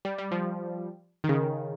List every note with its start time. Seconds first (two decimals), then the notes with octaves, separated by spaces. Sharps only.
0.05 G3
0.18 G3
0.31 F3
1.24 D#3
1.29 C#3